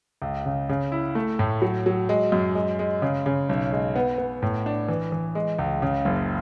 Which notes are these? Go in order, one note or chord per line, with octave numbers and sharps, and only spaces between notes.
C#2
C#3
C#3
E4
A3
A2
F#3
F#3
G#3
F#2
G#3
G#3
C#3
C#3
B1
G#3
B3
B3
A2
D4
E3
E3
G#3
C#2
C#3
F#1